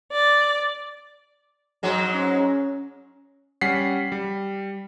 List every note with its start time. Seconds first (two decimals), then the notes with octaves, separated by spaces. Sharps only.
0.12 D5
1.83 G#2 F#3 G#3
2.14 C#4
3.61 G3 C#4 F#5 B6 C7
4.12 G3